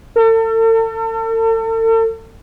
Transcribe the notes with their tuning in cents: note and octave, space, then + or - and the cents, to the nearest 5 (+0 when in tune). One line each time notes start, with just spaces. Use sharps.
A4 +40